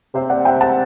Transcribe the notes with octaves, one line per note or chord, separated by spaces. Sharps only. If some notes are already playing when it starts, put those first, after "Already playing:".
C3 C5 E5
D5 F#5
E5 G5
F#5 A5